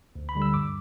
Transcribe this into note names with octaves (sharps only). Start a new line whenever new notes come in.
D2
B5
D3 G3
E6
G2 D6